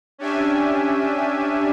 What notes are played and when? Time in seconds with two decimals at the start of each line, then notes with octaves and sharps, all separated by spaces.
0.18 C#4 D4 G4 E5 G#5